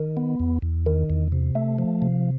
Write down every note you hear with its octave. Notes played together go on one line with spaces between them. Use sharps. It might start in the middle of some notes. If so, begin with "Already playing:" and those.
Already playing: D#3
B3
E2
E2
D#3
E2
C3
A3
F3
C3